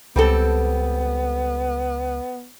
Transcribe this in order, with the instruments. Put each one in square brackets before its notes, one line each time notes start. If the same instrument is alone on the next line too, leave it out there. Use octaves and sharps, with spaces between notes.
[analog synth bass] C#2 [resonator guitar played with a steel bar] G3 C4 A4 [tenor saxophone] B3